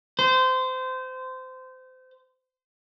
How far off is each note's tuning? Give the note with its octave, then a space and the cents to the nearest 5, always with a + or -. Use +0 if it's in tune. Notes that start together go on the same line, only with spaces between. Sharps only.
C5 -25